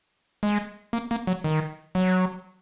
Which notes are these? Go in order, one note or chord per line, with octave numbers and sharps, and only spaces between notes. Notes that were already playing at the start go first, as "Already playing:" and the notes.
G#3
A#3
A#3
F#3
D#3
F#3